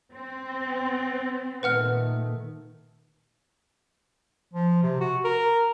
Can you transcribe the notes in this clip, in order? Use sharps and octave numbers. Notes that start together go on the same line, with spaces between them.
C4
A#2 D#3 A3 B4 F#5 F6
F3
C3
F#4
A#4